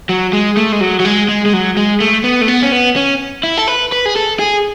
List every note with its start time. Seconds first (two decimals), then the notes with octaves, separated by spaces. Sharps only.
0.09 F#3
0.33 G#3
0.57 A3
0.72 G#3
0.81 F#3
1.00 F#3
1.05 G#3
1.29 G#3
1.46 G#3
1.53 F#3
1.77 G#3
2.00 A3
2.24 B3
2.41 A3
2.48 B3
2.62 C#4
2.72 B3
2.96 C#4
3.43 E4
3.57 A4
3.68 B4
3.92 B4
4.05 G#4
4.16 A4
4.39 G#4